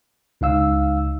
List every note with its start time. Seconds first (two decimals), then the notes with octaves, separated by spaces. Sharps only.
0.41 C#2 D#4 F5 E6